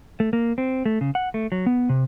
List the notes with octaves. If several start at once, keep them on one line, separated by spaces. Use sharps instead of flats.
A3
A#3
C4
A3
C#3
F#5
A3
F#3
B3
C3